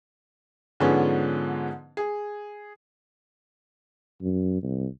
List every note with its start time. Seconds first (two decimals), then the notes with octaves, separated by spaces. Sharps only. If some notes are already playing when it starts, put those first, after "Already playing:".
0.80 G#2 D3 F3 G#3 B3 C#4
1.97 G#4
4.21 F#2
4.63 C2